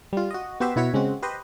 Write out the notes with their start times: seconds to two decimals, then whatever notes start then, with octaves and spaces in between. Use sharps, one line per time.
0.13 G3 F4
0.31 F#4 D#5
0.60 B3 F#4 G4 C5 E5
0.76 B2 E4 F#4 C#5 B6
0.93 C#3 G#3 C4 F#4
1.22 G4 B4 C5 D#5